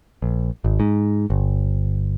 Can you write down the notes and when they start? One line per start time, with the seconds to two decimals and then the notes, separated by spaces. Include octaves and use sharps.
0.22 A#1
0.64 G#1
0.80 G#2
1.30 G1